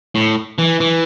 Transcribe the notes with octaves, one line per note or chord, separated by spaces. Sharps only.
A2
E3
E3